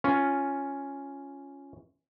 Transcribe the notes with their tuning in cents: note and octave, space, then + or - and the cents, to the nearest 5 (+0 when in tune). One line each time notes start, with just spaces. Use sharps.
C#4 +0 F4 +0